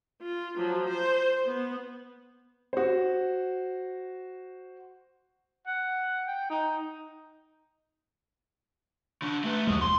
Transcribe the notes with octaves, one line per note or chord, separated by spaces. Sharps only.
F4
F3 F#3
C5
B3
F#4 C5
F#5
G5
D#4
C#3 D4
A3 B4
D#2 F3 F#3 G#3
E1 C6